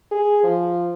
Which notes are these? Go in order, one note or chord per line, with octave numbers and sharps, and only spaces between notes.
G#4
F3